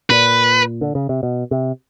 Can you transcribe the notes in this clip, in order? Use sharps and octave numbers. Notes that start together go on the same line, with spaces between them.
A#2 B4
D3
C#3
C3
B2
C3